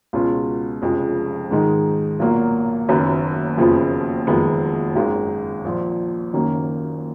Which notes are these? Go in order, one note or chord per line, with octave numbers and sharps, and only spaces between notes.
C#2 B2 G#3 C#4 F4
F1 F2 C#3 G#3
G#2 D#3 G#3 D#4
B1 A#2 F#3 A#3
F#1 F#2 D#3 F#3 B3
F#1 F2 C#3 F3 B3
F#1 F2 D#3 G#3 B3
G#1 F#2 D#3 G#3
A#1 A#2 F3
F#1 F#2 D#3 A#3 C#4